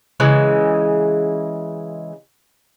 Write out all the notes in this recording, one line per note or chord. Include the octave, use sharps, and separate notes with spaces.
C#3 E3 G#3